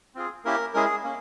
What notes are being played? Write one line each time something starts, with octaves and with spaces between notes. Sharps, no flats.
C4 F4 G#4
A#3 C#4 E4 G4 A#4
G#3 C#4 E4 G#4 A#4
G#4
A#3 C#4